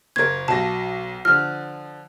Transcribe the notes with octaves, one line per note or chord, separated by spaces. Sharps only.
F#1 A#4 G#6
B1 F#3 A5 A#6
D3 F3 F6